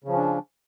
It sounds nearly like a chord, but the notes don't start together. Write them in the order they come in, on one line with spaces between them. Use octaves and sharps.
C#3 F3 C#4 D4